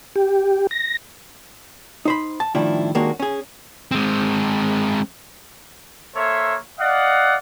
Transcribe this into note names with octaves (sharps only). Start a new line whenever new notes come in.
G4
A#6
D#4 C5 B5
A5
A2 D#3 F3 G3 D4 E4
D#2 G#3 A#3 C#4 D4 F#4
C#4 G#4
G#3 C4
A#3 A4 C5 C#5 E5
D5 D#5 F5 F#5